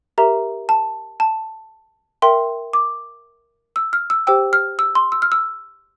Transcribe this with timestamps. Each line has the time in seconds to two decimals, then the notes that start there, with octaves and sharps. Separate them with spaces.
0.18 G4 A#4 E5 A#5
0.69 A5
1.20 A5
2.22 A#4 E5 G5 C6
2.73 D6
3.76 E6
3.93 F6
4.10 E6
4.27 G4 C5 G5 E6
4.53 F6
4.79 E6
4.95 C6
5.12 E6
5.22 F6
5.32 E6